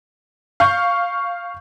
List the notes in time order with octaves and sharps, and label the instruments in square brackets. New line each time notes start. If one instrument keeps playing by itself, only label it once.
[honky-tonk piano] F5 C#6 G6